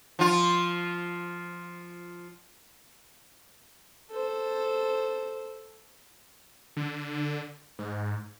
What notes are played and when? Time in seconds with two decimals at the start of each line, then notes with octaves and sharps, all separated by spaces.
0.19 F3 F4
4.11 A4 C5
6.77 D3
7.79 G#2